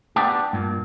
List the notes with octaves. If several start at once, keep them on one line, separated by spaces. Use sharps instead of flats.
B3 D4 G4
G2 A#2